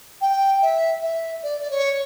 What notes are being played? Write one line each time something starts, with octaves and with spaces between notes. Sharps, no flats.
G5
E5
E5
D5
D5
C#5